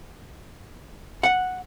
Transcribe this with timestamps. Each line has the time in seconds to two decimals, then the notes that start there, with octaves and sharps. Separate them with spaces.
1.23 F#5